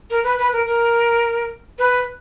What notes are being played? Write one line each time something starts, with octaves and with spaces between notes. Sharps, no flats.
A#4
B4
B4
A#4
A#4
B4